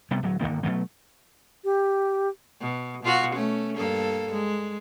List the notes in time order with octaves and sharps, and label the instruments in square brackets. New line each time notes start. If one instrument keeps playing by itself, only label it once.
[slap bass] C3 G3 B3
D1 F#3
G1 D#2 D#3 A#3
B2 D3 F#3 A3
[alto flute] G4
[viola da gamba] B2
B2 F4 F#4
A3 C#4
G2 A#3 A4
G#3